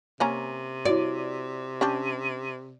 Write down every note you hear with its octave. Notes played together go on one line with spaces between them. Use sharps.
C3 A#3 C#4 G#5 A#5
E4 F#4 D5
C#4 D4 G4 A5